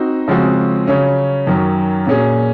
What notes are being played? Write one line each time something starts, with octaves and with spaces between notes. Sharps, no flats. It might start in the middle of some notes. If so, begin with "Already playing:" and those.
Already playing: C4 D#4 F#4
C#3 F3 G#3 C4 F#4
C#3 F#3 C#4
F#2 D#3 F#3 C#4
A#2 F#3 C#4 G#4